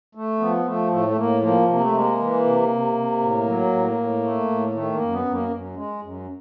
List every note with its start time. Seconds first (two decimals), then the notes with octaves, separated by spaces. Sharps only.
0.15 A3
0.40 F3 B3
0.65 F3 A3
0.91 A2 A3
1.08 A3
1.17 A2 A#3
1.42 F3 A#3
1.68 C3 A#3
1.81 A3
1.93 G#3 A#3
2.19 E3
2.44 C3
2.70 C3
2.95 C3
3.20 A2
3.46 F#3
3.73 A2
3.97 A2
4.23 A3
4.49 A2
4.69 A#3
4.75 D#3 A3
4.94 A#3
5.00 F#2
5.12 B3
5.25 F#2
5.32 A#3
5.51 F#2
5.76 G#3
6.02 F#2